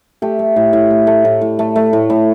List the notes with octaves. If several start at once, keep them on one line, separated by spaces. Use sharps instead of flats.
A3 G4
A3
A2
A2
A3
A3
A2
A2
A3
A3
A2
A2